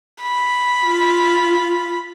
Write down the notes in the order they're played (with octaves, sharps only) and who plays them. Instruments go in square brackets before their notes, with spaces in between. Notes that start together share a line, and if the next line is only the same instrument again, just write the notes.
[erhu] B5
[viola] F4